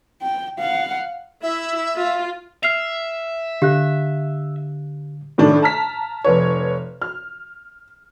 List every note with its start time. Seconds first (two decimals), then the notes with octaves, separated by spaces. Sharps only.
0.22 G5
0.59 F5 F#5
1.43 E4 E5
1.96 F4
2.63 E5 F6 C7 F7
3.62 D3 G4 F5 F#6
5.38 A2 D#3 D4
5.62 A5 A#5 F6 B6
6.24 F1 B4 C#5
7.02 F6